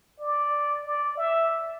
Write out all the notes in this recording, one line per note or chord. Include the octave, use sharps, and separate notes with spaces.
D5
D5
E5